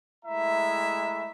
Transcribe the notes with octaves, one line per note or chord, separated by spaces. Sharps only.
G#3 A3 E4 E5 A#5